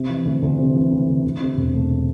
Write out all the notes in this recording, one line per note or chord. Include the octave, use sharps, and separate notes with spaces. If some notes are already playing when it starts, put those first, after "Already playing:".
Already playing: C3
E3
D2
D2
C3
E3
D2
D2
D2
C3
E1
A3